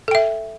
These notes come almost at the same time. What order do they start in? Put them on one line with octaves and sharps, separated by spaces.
A4 G5 E5